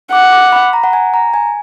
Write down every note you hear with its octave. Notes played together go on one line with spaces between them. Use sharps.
F#5 D6
D6
B5
A#5
F#5
G#5
A#5
G#5